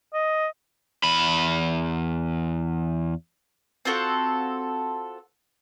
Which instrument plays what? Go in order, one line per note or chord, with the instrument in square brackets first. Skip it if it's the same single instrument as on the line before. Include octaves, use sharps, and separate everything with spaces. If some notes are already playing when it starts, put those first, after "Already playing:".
[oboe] D#5
[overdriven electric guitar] E2 B5
[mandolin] C4 F4 F#4 A4